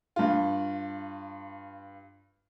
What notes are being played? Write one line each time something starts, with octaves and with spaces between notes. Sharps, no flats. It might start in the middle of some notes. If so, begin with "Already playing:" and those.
G2 F4